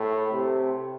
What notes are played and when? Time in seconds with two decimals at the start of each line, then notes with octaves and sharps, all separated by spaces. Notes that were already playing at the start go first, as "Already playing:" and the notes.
Already playing: A2
0.32 C3